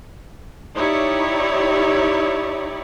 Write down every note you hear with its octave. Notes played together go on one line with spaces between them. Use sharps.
D#4 E4 G4 C#5 D5